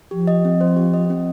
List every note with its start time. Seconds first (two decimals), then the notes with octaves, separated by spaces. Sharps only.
0.11 F3 G4
0.27 D#5
0.45 C4
0.61 C5
0.76 G4
0.94 D#5
1.10 C4